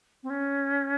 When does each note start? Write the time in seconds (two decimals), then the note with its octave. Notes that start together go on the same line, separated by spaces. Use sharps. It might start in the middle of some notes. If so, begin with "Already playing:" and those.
0.23 C4
0.30 C#4